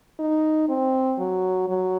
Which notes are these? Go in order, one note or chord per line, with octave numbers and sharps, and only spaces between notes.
D#4
C4
F#3
F#3